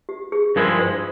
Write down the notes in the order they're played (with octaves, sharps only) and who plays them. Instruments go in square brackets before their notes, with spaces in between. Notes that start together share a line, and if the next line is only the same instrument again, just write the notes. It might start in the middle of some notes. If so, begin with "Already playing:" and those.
[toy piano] G4
G#4
[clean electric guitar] G2 F3 G#3 E4 [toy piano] A#4
[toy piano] C5